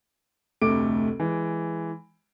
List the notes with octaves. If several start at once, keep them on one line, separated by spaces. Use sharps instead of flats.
F1 D2 C3 A3 D6 D7
E3 G#3